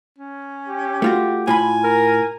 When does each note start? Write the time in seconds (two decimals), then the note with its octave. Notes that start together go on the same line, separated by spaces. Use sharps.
0.18 C#4
0.67 G4
1.02 A3 F4 F#4
1.47 A2 F4 G#5 B5
1.84 A#4